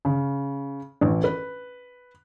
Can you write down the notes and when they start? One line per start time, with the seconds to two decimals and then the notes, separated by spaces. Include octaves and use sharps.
0.05 C#3
1.01 A1
1.24 B4